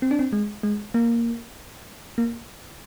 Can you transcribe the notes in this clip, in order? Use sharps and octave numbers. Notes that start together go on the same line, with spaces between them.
C4
D4
C4
G#3
G#3
A#3
A#3